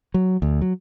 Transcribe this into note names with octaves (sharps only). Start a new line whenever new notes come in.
F#3
D2
F#3